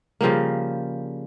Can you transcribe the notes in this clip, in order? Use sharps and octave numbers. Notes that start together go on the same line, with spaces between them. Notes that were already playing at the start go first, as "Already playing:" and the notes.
C#3 F3 G3 A#3